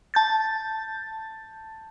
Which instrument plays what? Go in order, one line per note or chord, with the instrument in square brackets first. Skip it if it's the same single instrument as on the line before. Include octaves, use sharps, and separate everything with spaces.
[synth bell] A5 G6 A6